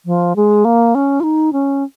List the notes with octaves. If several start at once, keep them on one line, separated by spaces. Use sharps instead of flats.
F3
G#3
A#3
C#4
F4
D#4
C#4